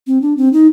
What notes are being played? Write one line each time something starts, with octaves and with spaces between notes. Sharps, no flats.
C4
D4
C4
D#4